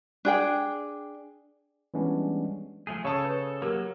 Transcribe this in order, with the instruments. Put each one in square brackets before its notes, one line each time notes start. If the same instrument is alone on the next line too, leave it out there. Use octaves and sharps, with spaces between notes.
[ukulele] D4 G#4 G5
[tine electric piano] E3 G3 G#3 B3 C#4 D4
[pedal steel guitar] F3 A3 G#4
[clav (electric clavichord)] C#3 [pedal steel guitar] A4 [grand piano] C#5 A5 D#6
[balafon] B4
[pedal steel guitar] F#3 A#3 [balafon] G4 A#4 [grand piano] E6